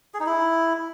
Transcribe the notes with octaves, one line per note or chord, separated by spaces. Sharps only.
G#4
D#4
E4